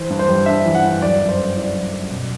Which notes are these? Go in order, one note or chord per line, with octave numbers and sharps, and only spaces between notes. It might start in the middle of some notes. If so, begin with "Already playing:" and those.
Already playing: E3 C5
G2
C5
G3
D4 E5
E3
F#5
G2
F#3 D5
F#2
C5
A3
E4 D5
F#3
F#2
B2